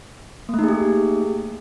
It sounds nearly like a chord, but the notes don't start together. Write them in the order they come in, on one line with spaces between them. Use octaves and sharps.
A#3 A3 D#4 G#4 G4